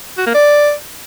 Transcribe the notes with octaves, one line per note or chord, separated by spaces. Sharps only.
F#4
A#3
D5